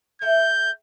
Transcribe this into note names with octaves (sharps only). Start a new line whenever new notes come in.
A3 E5 G5 G6